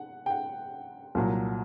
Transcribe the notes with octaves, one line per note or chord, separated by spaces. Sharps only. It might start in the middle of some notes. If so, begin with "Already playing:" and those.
Already playing: F#5
G5
F#5
C2 A#2 F#3